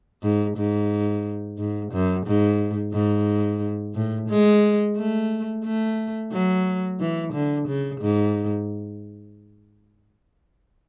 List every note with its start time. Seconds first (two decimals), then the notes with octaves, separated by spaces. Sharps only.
0.23 G#2
0.57 G#2
1.58 G#2
1.92 F#2
2.26 G#2
2.93 G#2
3.94 A2
4.29 G#3
4.96 A3
5.64 A3
6.32 F#3
7.00 E3
7.33 D3
7.68 C#3
8.01 G#2